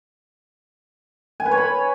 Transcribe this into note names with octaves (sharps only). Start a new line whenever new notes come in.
G#5
B4
C#5
B5